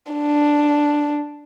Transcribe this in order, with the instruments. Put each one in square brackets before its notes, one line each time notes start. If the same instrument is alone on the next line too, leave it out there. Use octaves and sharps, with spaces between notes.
[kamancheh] D4